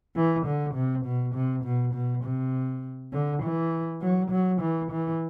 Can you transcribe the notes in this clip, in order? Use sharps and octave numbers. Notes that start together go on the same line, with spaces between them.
E3
D3
C3
B2
C3
B2
B2
C3
D3
E3
F#3
F#3
E3
E3